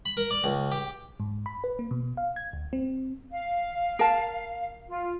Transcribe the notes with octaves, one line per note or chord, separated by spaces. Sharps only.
B5
A#4
D5
C#2
G4
G#2
B5
B4
A#3
B2
F5
G#6
D2
C4
F5
A#4 A5
F4